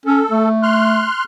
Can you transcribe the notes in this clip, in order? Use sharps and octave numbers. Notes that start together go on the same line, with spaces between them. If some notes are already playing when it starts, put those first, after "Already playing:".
C#4 A4
A3
C6 F6 F#6